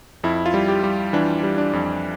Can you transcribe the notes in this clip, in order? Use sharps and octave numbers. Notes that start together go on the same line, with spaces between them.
F2 E4
F4
G3
G4
G3
E3 D4
G3
D4
F2